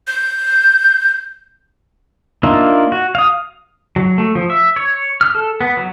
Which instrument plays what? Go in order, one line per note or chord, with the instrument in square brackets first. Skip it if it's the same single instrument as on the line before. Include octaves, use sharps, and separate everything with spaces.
[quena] G6
[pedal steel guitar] A#3 D4 D#4 F4 E5
F#4
F5 D#6
F#3
A3
F3
E5
C#5
F6
A4
B3
F#3